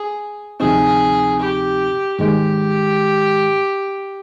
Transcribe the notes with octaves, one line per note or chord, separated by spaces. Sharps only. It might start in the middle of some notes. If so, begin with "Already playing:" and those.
Already playing: G#4
D2 C3 F3 C4 D#4 G#4
G4
G#2 D#3 G#3 G4